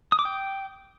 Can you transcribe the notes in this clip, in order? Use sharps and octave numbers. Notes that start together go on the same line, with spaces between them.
D#6
D6
G5